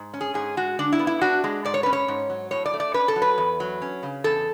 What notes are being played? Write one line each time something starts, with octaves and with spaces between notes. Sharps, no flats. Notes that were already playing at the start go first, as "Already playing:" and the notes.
Already playing: G#2
C#4
G#4
G#2 G#4
G#3 F#4
D3 D4
E4
B3
E4
D4 F#4
G#3
G#2 D5
C#5
C#4 B4
C#5
G#2
F#3
A2 C#5
D5
A3
D5
C#4 B4
A4
F#3
B4
E2
F#3
C#4
C#3
E2 A4